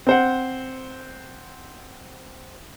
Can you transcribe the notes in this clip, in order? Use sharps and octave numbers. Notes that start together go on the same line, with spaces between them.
C4 C5 F#5